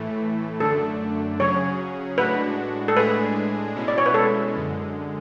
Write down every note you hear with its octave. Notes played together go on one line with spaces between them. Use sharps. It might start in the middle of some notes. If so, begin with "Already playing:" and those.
Already playing: A2 E3 A3
F#2 D3 A3 D4 A4
C#3 F#3 C#4 G#4 C#5
A2 G#3 D4 F#4 B4
A4
A2 G#3 D4 G#4 B4
B2 G#3 C#4 E4
D5
C#5
B4
A4
F#2 D3 G#3